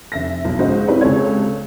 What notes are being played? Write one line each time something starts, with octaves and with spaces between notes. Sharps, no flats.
F1 E5 A#6
B1
C#2 G#2 F#4 C5 D#5
C4 D#4 E4 G4 B4 C#5
C#2 C3 G#4 A4 C#5 G#6